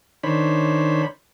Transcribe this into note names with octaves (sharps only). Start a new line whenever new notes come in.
D#3 D4 C5 C#5 B5